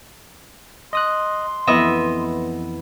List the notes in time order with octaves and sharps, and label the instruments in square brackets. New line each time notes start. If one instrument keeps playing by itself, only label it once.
[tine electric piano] D#5 D#6 F#6 [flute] C6
[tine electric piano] F2 E3 [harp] B3 D#5 E5